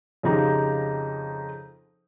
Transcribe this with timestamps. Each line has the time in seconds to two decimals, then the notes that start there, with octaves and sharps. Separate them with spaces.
0.23 F2 C#3 F3 D#4 G4 A#5